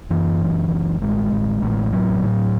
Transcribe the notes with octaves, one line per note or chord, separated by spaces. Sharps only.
F#2 E3
F#1
F#1
A1 G#3
A1
A1
A2 F#3
A2